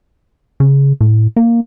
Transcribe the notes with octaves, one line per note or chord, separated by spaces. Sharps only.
C#3
A2
A#3